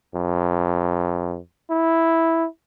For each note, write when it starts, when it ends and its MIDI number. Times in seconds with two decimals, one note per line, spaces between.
0.15 1.38 41
1.70 2.46 64